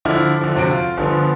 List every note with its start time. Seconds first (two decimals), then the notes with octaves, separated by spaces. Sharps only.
0.05 D3 F3 E4 D6 F6
0.41 D3 F3
0.56 F2 C3 C4 F#4 D7
0.71 F4
0.97 G1 D3 F3 B3